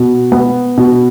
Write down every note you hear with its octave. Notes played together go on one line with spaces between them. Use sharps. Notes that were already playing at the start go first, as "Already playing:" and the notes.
Already playing: B2
B3
B2